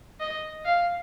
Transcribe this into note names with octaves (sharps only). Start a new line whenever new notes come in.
D#5
F5